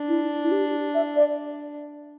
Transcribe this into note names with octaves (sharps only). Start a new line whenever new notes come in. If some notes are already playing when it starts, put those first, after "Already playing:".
Already playing: D4
E4
E4
G4
E5
D5